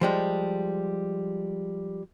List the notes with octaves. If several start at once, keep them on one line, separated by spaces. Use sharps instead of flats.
F3 G3 G#3